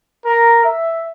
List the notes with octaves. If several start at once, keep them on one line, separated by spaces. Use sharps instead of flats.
A#4
E5